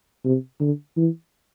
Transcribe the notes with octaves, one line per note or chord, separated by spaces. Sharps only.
C3
D3
E3